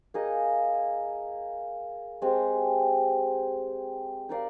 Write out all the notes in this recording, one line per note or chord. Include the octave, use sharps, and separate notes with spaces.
A#3 D#4 G#4 D#5
G#3 C4 G4
D#4 A#4 D5 F5